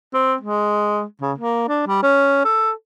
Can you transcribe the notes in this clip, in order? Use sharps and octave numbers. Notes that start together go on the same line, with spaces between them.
C4
G#3
C#3
A#3
D4
G3
C#4
A4